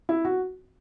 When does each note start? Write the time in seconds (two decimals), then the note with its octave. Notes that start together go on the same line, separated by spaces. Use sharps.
0.09 E4
0.25 F#4